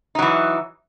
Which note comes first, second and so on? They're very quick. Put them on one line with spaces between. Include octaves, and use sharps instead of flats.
D#4 F#3 E3